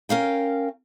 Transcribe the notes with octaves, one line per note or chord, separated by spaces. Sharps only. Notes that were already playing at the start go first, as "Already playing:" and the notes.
C#4 A#4 F5 G5